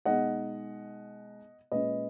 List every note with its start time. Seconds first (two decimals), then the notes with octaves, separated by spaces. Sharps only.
0.05 B2 G#3 D#4 D#5 F#5
1.72 A#2 G#3 C#4 B4 D#5